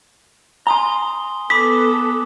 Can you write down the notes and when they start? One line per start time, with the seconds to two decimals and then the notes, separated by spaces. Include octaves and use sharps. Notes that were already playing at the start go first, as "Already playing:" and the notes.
0.67 G#5 A#5 C6 D#6 G7
1.50 B3 A4 B5 D6 D#6 B6